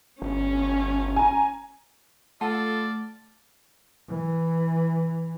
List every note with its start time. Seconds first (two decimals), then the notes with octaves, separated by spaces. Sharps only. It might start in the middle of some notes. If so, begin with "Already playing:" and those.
0.22 G1 C#4
1.16 G#5 A#5
2.41 A3 F4 A4 D5 F#5 A5 F6
4.09 E3